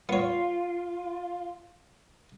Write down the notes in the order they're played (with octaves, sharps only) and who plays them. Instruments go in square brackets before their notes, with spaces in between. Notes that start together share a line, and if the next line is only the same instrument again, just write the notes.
[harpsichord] B3 C#5 [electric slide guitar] F4